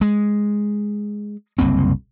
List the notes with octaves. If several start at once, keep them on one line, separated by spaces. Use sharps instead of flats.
G#3
F#1 C2 A#3 C4